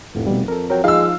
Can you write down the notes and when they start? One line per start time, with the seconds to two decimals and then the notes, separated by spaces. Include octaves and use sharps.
0.15 F1 F2 A2
0.27 B2 G3
0.48 F2 A4 A#4
0.70 F#3 A#4 G5
0.84 F3 G#3 D#4 F5 E6